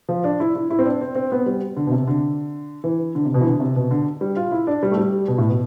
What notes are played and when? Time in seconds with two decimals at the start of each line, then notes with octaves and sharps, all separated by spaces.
0.09 F3
0.24 D4
0.40 E4
0.55 E4
0.70 E4
0.79 C4
0.85 D4
1.01 C4
1.15 C4
1.32 B3
1.46 G3
1.77 D3
1.87 B2
1.92 C3
2.08 D3
2.84 E3
3.15 D3
3.25 C3
3.34 B2
3.41 E3
3.46 D3
3.60 C3
3.76 B2
3.91 D3
4.21 G3
4.36 F4
4.51 E4
4.67 D4
4.83 G3
4.91 A3
4.97 G3
5.28 B2
5.38 A2
5.49 B2